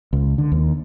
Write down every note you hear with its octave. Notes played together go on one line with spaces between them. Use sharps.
C#2
D3
D#2